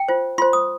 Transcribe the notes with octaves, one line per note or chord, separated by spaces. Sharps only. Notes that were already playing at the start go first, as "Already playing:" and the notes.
Already playing: G5
F4 C5
F4 C5 C6
D#6